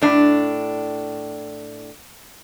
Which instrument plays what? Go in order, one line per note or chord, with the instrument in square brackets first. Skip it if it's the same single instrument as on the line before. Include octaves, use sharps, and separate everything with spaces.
[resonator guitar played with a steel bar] A2 D4